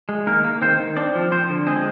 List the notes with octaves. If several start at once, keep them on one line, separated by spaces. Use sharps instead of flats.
G#3
D#3 A#3 A#4
A#3
D#3 C4 C5
D#3
C4 D4 D5
F3
F3 C4 C5
D3
G#3 C4 G#4